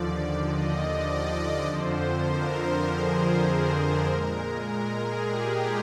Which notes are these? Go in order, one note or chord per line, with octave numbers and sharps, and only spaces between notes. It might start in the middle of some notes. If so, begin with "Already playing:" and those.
Already playing: D#2 D3 F3 D5
D#5
D5
F2 D3 F3 C5
A#4
G#4
A#4
A#2 G#3
A#4
G#4
G4